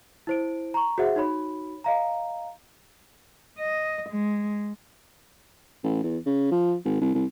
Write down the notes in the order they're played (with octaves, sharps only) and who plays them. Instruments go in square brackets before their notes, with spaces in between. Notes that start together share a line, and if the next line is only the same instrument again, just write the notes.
[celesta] E4 C5 D7
A#5 C#6
F#4 G#4 C5 E5 F#5
D#4 F#4 C#5 B5
D#5 F5 A#5
[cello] D#5
G#3
[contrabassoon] A1
E2
C#3
F3
G#1
C2
C2